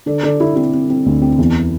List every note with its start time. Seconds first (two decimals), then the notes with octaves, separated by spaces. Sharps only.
0.06 D3 A4 D5
0.23 D3 A4 D5
0.40 D3 E4 A4
0.56 C4 E4
0.73 C4
0.89 C4
1.06 D2
1.22 C4
1.38 E2